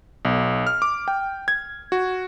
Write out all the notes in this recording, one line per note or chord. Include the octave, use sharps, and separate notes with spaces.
B1
F6
D6
G5
G#6
F#4